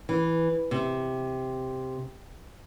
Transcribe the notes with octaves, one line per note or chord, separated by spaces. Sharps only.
E3
C3